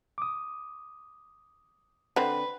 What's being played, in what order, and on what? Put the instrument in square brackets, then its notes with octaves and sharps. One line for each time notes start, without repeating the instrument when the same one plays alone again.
[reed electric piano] D6 D#6
[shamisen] D3 C4 B5 [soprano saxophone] B4